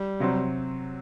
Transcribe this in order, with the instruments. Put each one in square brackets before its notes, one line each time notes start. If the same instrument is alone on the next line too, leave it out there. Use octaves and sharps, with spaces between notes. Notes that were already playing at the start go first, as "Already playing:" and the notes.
Already playing: [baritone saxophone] G3
[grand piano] C3 F#3 C4